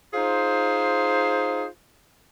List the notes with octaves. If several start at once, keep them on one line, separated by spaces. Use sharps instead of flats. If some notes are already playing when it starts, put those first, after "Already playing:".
D#4 F4 G#4 C5